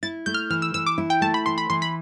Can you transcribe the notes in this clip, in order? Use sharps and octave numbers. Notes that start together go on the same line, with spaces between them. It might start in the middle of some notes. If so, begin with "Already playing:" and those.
E4 A6
A3 G6
F6
E3 F6
E6
E3 E6
D6
E4
G5
A3 A5
B5
E3 C6
B5
E3 C6
B5